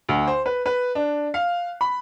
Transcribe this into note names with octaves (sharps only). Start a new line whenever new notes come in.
D2
C5
B4
B4
D4
F5
B5